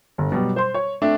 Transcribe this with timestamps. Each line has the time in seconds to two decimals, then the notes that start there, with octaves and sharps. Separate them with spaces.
0.18 G1
0.32 B2 F#3 G3
0.56 C5 C6
0.74 C#5
1.02 A3 C4 D4 D5 E5